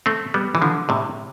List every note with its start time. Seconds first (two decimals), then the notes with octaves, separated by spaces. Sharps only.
0.06 A3 C4
0.34 G3 B3
0.55 E3
0.62 D3 F3
0.89 A2 C3